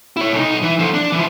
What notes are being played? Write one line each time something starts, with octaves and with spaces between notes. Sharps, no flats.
E4 C#5
B1 D#4
E3
D3 F3
D4
E3 F3